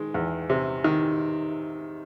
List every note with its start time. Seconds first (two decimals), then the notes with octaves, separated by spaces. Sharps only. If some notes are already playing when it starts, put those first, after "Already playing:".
Already playing: D#3 G#3
0.14 E2
0.50 C3
0.84 D#3